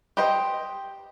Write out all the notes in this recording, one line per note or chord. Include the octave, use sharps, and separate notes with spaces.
G4 B4 C5 D#5 G5